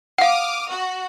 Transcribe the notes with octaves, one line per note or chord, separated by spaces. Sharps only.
F5 F#5 D6 D#6 F6
F#4